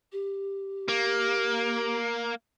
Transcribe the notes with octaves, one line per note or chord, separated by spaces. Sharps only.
G4
A#3